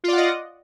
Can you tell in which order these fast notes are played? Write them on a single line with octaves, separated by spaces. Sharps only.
F4 D5 F#5 D#5